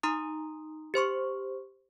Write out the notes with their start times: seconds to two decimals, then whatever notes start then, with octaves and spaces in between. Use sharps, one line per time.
0.03 D#4 A#5 C6 D#6
0.94 G4 C5 C6 C#6